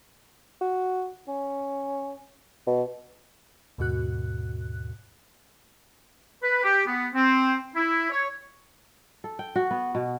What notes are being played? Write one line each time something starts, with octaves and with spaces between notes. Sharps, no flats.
F#4
C#4
B2
D#2 G#2 B2 F#4 F#6
B4
G4
B3
C4
E4
C#5
A4
G5
F#4
B3
B2